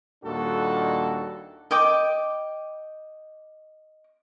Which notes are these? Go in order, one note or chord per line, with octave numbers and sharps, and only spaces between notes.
D#2 A#2 G3 D4 F#4 A4
D#5 G5 D6